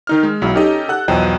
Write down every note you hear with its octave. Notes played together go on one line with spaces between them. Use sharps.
D#3 D#4 F6
G#3
B1 F#3 E4
C#4 D#4 G4 A4 D#5
A4 F#5 F#6
B1 E2 F3 F#3 D#5 G5